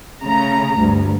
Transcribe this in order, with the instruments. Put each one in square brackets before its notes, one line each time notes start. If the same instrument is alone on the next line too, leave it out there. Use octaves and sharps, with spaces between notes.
[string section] C#3 A3 A#5
D2 G2